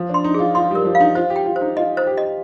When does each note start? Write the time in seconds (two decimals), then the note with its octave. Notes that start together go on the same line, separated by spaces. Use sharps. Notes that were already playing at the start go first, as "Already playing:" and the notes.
Already playing: F3
0.09 D4 C6
0.24 D#4
0.34 F4 G#4
0.55 F4 C6
0.70 G3 A#4
0.85 F3
0.95 F5
1.00 D#4
1.15 F4 C5
1.30 G4
1.36 G5
1.46 F4
1.56 D#4 C5
1.77 F4 D#5
1.97 C5
2.07 G4
2.17 D#5